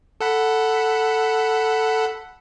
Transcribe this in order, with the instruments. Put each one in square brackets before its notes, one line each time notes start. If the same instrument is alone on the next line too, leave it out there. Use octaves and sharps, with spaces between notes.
[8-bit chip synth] A4 F#5 B5